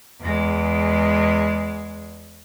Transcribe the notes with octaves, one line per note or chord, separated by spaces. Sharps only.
E2 G#3